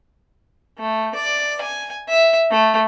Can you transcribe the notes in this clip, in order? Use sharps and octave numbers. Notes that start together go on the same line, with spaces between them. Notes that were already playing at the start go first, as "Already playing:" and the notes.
A3
D5
G#5
E5
A3